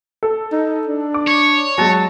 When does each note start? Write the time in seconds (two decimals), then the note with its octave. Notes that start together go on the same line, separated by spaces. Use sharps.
0.23 A4
0.52 D#4
0.87 D4
1.14 D6
1.28 C#5
1.78 F#3 G#3 A5